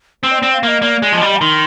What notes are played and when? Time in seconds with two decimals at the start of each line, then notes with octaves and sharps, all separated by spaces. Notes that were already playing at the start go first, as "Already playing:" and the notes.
0.23 C4 C5
0.31 D#5
0.38 C4 D5
0.53 F5
0.63 A#3 D#5
0.82 A#3 D5
1.02 G#3
1.12 F3 D#5
1.21 G3
1.41 D#3 C6